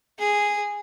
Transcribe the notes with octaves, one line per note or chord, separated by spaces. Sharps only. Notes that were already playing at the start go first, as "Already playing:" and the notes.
G#4